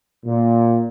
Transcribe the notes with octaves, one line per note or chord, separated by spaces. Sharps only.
A#2